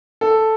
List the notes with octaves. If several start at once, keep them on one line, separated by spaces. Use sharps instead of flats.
A4